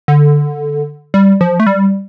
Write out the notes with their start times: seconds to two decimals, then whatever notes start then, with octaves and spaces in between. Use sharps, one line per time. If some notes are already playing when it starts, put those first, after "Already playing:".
0.08 D3
1.14 G3
1.41 F3
1.60 A3
1.67 G3